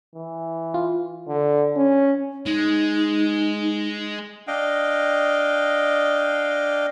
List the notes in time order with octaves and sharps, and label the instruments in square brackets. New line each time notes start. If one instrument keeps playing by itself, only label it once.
[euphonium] E3
[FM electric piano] F4
[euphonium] D3
C#4
[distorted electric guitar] G#3 [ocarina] D#4
[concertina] D4 D#5 F5 G5